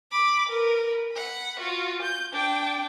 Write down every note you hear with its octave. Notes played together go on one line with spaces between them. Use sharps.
B5 D6
A#4 B4
F#5 B5
F4 F#4
G6
D4 G5